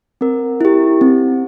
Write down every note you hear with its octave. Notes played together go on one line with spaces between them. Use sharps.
C4 A#4
E4 G4
C4